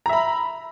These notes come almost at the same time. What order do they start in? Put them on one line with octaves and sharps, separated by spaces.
A#5 E5 B5